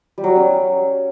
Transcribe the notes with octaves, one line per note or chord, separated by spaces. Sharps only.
G3
F#3
G3
C#4